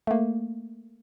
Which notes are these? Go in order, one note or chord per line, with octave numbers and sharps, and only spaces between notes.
A3 A#3